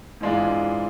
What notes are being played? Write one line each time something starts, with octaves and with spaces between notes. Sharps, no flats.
G#2 E3 G#3 D4 F4